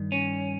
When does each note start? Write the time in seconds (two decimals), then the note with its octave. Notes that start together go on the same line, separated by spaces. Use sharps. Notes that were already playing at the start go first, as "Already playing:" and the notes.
Already playing: G2 D#3
0.12 C#4